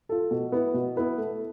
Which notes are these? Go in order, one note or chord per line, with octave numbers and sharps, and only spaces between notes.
F4 A4
B2
B3 E4 B4
B2
B3 E4 B4
A3